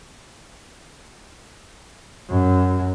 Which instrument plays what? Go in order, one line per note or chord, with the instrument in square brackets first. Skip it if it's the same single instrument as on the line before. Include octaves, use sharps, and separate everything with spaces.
[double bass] F#2